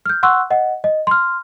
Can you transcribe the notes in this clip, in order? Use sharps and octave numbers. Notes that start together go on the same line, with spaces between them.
F6 G6
F#5 C6 C#6 E6 F#6
D#5 F#5
D#5
C6 F6